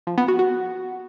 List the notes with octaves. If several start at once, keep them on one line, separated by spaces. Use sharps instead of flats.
F3
B3
F#4
F#4